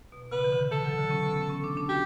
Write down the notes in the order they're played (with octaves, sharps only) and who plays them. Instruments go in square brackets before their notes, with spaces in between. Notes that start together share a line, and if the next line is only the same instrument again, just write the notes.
[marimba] B2
[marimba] C#3 [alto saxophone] B4
[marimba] E3
D3
[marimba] E3 [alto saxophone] A4
[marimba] F#3
D3
C#4
B3
B3
C#4
D4
D4
[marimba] F#4 [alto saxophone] G4